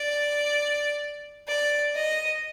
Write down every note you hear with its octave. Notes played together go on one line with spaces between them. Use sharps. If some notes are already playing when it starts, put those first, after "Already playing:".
Already playing: D5
D5
D#5